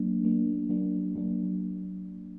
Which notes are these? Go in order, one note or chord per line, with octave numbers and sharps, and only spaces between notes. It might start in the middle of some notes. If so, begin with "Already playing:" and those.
Already playing: F#3 A#3 D4
F#3 A#3 D4
F#3 A#3 D4
F#3 A#3 D4